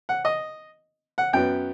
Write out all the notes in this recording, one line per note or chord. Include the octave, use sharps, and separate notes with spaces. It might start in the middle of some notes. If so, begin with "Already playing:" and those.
F#5
D#5
F#5
F#2 F#3 B3 G5